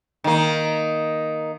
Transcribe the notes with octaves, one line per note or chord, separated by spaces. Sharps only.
D#3 A#3